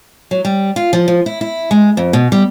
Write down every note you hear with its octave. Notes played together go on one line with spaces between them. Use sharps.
F#3
G3
F4
F3
F3
E4
E4
G#3
F2
B2
G3